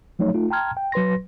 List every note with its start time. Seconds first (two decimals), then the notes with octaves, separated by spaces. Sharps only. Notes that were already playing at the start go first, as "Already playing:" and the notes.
0.19 F3 F#3 A3 D#4 C#5
0.34 A3 D#4 F4
0.50 G5 A5 A#5 C6 F6 G#6
0.77 G5
0.92 F#3 B4 C6 A#6